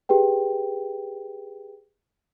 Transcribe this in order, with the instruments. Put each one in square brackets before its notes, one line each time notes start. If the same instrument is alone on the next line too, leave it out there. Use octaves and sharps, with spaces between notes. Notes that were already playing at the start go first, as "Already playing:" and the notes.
[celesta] G4 G#4 B4 G5